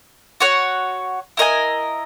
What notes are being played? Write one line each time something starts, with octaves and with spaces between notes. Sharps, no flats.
F#4 C#5 F#5
E4 A#4 D#5 G#5